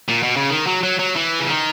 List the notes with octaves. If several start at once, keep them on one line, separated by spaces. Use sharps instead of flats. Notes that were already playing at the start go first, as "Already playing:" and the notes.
A#2
B2
C#3
D#3
F#3
F#3
F#3
E3
C#3
D#3